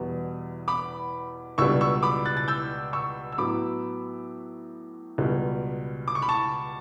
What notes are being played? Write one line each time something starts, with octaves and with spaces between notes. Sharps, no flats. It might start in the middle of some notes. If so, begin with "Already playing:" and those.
Already playing: E2 B2 G3
B5 D6
C#2 B2 G3 D4 C#6 E6
C#6 E6
B5 D6
F#6 A6
A6
E6 G6
C#6 E6
E6
A2 F#3 B3 E4 B5 D6
C#2 B2 G3
D6
C#6
B5
A5 C#6